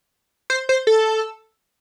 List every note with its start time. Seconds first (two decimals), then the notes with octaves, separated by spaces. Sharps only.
0.50 C5
0.69 C5
0.87 A4